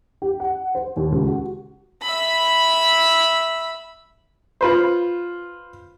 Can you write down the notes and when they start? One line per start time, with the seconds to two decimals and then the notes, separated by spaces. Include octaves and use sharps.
0.22 G4
0.40 F#5
0.75 C5
0.96 D#2
1.12 C#2
1.27 F#4
2.02 E5 B5
4.61 F4 B4 C5